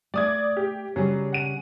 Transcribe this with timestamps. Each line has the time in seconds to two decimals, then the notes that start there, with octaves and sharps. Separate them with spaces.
0.14 A3 D5 D#6 G#6
0.57 G4
0.96 C#3 F#3 G3
1.32 F#5 D#7